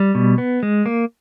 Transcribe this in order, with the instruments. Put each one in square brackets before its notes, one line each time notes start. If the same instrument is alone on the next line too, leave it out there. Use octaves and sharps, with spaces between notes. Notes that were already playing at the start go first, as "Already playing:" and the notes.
Already playing: [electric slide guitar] G3
B2
B3
G#3
A#3